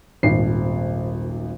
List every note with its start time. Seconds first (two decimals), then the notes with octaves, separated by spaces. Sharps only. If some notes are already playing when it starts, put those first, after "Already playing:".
0.23 D#1 G#1 C7